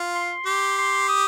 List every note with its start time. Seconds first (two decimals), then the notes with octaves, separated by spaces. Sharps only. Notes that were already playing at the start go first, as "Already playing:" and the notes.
Already playing: F4
0.15 C6
0.46 G4 C6
0.78 C6
1.09 D#6